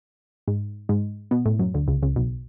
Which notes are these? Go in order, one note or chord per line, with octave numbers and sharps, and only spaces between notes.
G#2 G#3
G#2 G#3
B2 B3
A2 A3
F#2 F#3
D2 D3
C#2 C#3
C#2 C#3
B1 B2